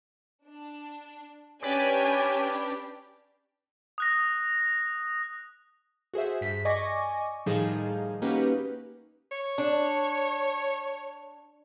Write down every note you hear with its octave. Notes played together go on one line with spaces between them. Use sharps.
D4
C#4 D4 G4 B4 C#5 D5 G#5
D#6 F#6 A#6
F#4 G#4 C5 E5
G2 B6
D5 D#5 G#5 C#6 D6 A#6
A2 D#3 F3 G3 D#4 G#4
A#3 C#4 D#4 F#4 G4 B4
C#5
D4